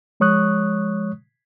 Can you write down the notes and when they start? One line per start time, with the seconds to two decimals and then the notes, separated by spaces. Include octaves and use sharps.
0.20 F3 G#3 C#5 C#6 D#6 F#6